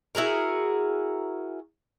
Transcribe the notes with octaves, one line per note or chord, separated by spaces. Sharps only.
E4 F#4 G#4 A#4